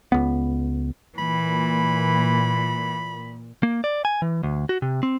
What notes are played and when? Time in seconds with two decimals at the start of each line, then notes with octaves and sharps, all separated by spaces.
0.12 C#2 B3
1.18 A#2 E3 B5
3.63 A#3
3.84 D5
4.05 G#5
4.22 E3
4.43 D2
4.69 F#4
4.82 C3
5.03 C4